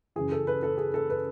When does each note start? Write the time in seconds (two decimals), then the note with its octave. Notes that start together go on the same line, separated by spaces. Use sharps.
0.16 F#2 C#3 E3 G#4
0.32 A4
0.47 B4
0.63 A4
0.78 G#4
0.94 A4
1.10 B4